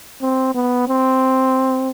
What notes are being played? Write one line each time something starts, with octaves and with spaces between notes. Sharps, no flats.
C4
B3
C4